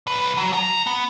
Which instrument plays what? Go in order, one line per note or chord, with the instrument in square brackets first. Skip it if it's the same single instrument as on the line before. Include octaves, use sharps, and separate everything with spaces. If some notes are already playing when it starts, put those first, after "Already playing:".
[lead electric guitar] C2 B4
F#3
F3 A#5
B3